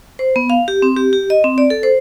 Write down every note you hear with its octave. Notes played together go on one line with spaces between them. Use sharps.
C5
B3
F5
G4
C4
G4
G4
D#5
C4
D5
A4
C5